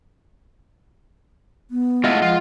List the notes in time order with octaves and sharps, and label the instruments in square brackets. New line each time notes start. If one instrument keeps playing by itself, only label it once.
[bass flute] B3
[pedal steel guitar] G#3 D#5 F#5 [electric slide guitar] A3 E4 F4
[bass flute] F3 [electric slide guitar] F4